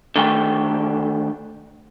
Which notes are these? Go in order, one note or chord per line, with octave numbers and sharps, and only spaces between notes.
D3 D#3 A3 G5